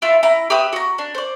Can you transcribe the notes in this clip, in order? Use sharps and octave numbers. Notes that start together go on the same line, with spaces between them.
E4 F4 E5
E4 A#5
G4 B4 E5 D#6
F#4 A#5
D4
C5 D5